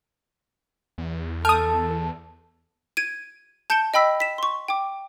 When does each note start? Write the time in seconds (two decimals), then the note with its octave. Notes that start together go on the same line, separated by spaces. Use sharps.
0.98 E2
1.45 A4 A5 D#6 F6
2.97 G#6 D7 D#7
3.70 A5 G6 C#7 D7 E7 G7
3.94 D#5 G5 B5 E6 B6
4.20 B6 E7
4.38 C6 C#6
4.68 G5 D6